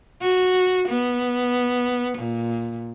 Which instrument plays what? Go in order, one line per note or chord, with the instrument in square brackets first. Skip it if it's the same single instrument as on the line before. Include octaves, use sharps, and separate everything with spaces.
[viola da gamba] F#4
B3
A#2